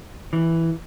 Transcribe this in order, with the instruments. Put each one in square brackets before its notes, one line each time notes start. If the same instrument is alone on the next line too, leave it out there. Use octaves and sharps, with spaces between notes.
[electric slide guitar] E3